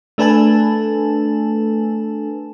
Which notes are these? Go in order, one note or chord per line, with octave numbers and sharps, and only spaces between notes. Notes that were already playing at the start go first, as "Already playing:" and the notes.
A3 D4 A4 B4 G#5 A5